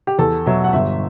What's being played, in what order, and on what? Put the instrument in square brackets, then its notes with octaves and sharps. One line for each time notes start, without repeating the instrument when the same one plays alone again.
[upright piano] G4
E2 A4
B2 F#3 E5
F#5
G1 E5